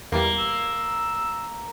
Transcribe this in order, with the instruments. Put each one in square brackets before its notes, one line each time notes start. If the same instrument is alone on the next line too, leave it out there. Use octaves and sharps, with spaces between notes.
[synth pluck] E2 E3 G3 [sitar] A#3
[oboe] E6